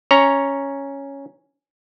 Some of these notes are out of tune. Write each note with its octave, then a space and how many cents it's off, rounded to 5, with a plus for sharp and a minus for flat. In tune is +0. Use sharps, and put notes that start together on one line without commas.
C#4 +0 C#5 +0 A#5 +0